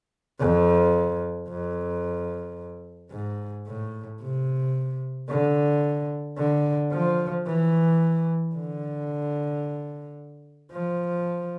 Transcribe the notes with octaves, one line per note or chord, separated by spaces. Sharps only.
F2
F2
G#2
A2
C3
D3
D3
F3
E3
D3
F3